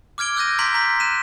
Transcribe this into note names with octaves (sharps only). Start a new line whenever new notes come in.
D6 F6 G#6 D7 G7
E6 F#6 G6 A#6 D#7
A#5 C6 G6 B6 D7 F#7
A#5 B6
F#6 D#7 E7